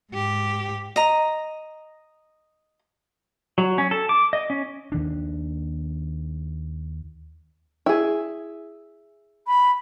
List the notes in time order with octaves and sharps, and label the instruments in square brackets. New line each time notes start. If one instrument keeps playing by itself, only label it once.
[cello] G#2 G4
[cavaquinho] D#5 A#5
[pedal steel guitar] F#3
C#4
A4
D6
D#5
C#4
[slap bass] D#2 D#3 D4
[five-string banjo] E4 G#4
[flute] B5